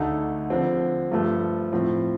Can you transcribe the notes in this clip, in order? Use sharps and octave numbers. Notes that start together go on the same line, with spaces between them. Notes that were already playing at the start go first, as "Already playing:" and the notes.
Already playing: D2 D3 A3 D#4
D3 F3 C4
G2 F3 A3
A2 F3 C4